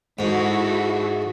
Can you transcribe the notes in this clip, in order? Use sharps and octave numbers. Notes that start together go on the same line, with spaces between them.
G#2 E4 F#4 A4